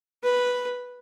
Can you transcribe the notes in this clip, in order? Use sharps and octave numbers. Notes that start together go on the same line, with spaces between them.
B4